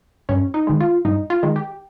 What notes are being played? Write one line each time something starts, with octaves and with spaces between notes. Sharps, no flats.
G2 C#4
D#4
D#3 G#3
F4
G2 D#4
F4
D#3 G#3
G4